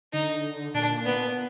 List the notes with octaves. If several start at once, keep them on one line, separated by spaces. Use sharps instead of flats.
D3 D#4
A#2 D4
B3